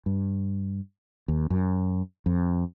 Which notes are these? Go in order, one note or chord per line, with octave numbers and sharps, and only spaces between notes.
G2
D#2
F#2
F2